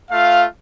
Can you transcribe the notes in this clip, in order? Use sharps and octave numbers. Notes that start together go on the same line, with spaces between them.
A3 F4 F5